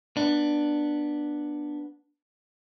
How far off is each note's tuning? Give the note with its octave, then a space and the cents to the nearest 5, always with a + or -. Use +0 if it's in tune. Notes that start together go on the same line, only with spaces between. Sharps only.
B3 -10 D4 +10